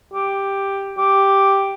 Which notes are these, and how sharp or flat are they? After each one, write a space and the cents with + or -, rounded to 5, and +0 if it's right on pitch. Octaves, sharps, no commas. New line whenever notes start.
G4 +5
G4 +0